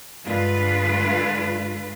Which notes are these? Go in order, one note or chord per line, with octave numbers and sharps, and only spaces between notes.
G2 D3 G#3 F4 B4